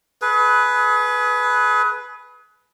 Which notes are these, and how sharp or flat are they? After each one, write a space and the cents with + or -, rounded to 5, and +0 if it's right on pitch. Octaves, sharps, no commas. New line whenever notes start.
G#4 +30 B4 +0